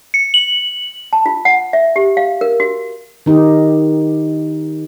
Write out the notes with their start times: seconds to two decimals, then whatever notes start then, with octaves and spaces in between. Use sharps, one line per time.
0.14 C#7
0.34 F#7
1.13 A5
1.26 F4
1.45 F#5
1.73 E5
1.96 G4
2.17 F5
2.41 A#4
2.60 F#4
3.26 D#3 D#4 G4